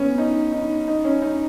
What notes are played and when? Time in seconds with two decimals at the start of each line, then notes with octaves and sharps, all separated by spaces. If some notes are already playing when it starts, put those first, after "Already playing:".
Already playing: B3 C#4
0.18 D#4
0.52 D#4
0.88 D#4
1.05 C#4
1.22 D#4